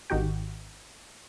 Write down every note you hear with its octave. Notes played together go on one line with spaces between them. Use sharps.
G#1 D#3 D#4 F#4 G4 G5